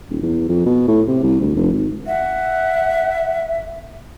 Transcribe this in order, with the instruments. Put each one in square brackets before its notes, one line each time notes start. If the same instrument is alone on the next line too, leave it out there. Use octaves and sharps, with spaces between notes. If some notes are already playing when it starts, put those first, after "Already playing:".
[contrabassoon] D#1
E2
F2
B2
A2
C3
C2
D2
F1
G#1
[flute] E5 [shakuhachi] F#5